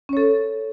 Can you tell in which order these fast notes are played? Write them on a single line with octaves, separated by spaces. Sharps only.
C#4 C#5 A4